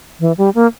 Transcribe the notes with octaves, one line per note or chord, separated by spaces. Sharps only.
E3
G3
A#3